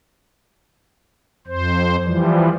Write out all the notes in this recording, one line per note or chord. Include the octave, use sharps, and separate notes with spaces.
F2 C5
E3 F3 G3